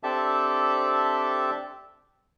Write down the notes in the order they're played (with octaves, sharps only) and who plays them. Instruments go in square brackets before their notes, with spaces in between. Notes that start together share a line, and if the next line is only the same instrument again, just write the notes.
[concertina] C4 D4 G4 A4 E5 A5